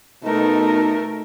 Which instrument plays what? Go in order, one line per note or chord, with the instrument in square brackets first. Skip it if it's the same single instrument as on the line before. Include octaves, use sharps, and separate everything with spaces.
[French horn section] B2 D#4 [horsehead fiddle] A3 A#4